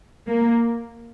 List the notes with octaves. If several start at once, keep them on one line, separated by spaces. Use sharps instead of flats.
A#3